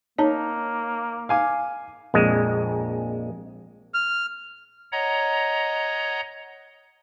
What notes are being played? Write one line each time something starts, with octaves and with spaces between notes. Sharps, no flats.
A#3 D#4 C#5 A5 A#5
F5 G#5 D6
A#1 F2 G#3
F6
C#5 D#5 F#5 A#5